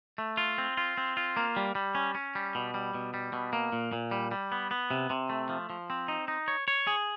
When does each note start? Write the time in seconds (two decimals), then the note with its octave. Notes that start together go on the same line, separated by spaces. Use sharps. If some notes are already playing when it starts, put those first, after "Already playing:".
0.18 A3
0.37 F4
0.58 C4
0.77 F4
0.97 C4
1.17 F4
1.37 A#3
1.56 G3
1.75 G3
1.95 C#4
2.15 C#4
2.35 G3
2.55 B2
2.74 G3
2.94 B2
3.14 G3
3.33 B2
3.53 A#3
3.73 A#2
3.93 A#2
4.11 G3
4.31 G3
4.52 B3
4.71 B3
4.91 C3
5.10 C3
5.30 A3
5.49 F3
5.70 F3
5.90 C4
6.08 D#4
6.28 D#4
6.48 C#5
6.68 C#5
6.87 G#4